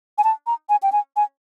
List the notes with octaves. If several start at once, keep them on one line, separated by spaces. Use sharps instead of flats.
G#5
A5
A#5
G#5
G5
G#5
G#5